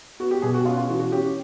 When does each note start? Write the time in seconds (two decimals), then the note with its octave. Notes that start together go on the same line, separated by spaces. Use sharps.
0.20 B3 F#4
0.31 G4
0.42 B2 G#4
0.54 F#4
0.65 C#4 F4
0.78 F4
0.89 E3 F#4
1.00 F#4
1.12 C#4 G4